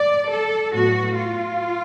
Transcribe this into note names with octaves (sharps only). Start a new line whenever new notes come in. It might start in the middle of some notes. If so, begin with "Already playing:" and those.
Already playing: D5
A4
A2 F#3 B3 F#4
F4